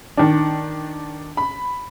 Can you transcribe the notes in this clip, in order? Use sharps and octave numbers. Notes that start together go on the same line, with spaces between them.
D#3 D4
B5